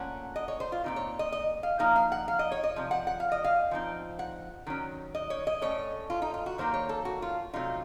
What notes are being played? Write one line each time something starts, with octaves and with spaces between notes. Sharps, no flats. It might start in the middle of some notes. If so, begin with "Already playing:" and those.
Already playing: A#2 A3 C#4 F#5
D#5
C#5
C5
F4
A#2 F3 C4 D#4
C#5
D#5
D#5
F5
F3 A#3 D#4 F5
F5
F#5
F5
D#5
C#5
D#5
C3 F3
F#5
F#5
F5
D#5
F5
F3 C4 D#4
F#5
D#3 F#3 C#4
D#5
C#5
D#5
A2 A3 C#4 C#5
F4
D#4
F4
F#4
D#3 F#3 A#3 D#4 C5
C#5
A4
F#4
F4
C3 F#3 A3 D#4 F4